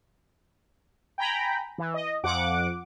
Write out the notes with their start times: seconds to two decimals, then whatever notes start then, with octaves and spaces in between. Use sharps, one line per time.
1.18 G5 G#5 A#5 B5
1.78 E3
1.94 D#5
2.23 F2 F3 F#5 D6